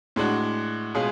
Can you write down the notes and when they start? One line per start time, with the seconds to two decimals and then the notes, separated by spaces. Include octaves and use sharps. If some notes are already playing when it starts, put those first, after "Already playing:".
0.16 A2 G#3 D4 F#4
0.95 B2 G#3 C#4 F4 G#4